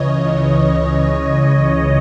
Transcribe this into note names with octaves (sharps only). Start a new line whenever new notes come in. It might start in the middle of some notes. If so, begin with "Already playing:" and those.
Already playing: C#2 C#3 E3 C#5 D#5
C#2 C#3 E3